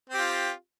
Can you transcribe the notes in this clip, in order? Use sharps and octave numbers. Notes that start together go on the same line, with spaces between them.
C4 F4 G4